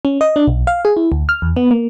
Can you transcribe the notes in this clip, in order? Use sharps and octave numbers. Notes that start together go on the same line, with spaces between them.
C#4
D#5
D4
B1
F5
G#4
E4
D2
F6
E2
B3
A#3